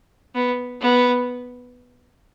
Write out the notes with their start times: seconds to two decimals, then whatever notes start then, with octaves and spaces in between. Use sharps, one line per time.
0.35 B3
0.81 B3